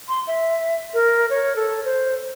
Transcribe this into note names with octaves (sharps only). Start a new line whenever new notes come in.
C6
E5
A#4
C#5
A4
C5